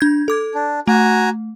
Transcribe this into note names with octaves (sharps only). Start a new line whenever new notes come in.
D4 G6 G#6
A4 D6 G#6
D4
A3 F#4 G#5 A#5